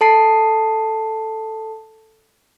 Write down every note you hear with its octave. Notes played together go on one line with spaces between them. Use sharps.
A4 A5 C7